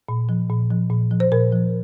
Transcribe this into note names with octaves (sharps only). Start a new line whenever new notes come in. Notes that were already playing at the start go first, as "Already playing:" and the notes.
A#2
F3
A#2
F3
A#2
F3
C5
A#2 A#4
F3